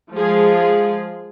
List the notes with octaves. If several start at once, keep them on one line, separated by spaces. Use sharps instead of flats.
F3 G#3 F4 G#4